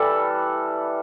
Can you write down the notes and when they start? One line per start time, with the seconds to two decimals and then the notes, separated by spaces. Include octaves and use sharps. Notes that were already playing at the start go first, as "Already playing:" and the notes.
Already playing: E3 G3 A4 B4